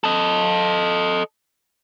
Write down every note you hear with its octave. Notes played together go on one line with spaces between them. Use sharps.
A4 D#5